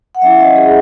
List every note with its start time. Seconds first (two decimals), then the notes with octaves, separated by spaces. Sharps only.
0.15 F#5
0.22 F#3 C#4 E4 E5
0.40 D#5
0.56 G#4